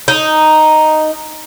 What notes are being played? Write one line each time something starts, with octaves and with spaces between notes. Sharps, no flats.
D#4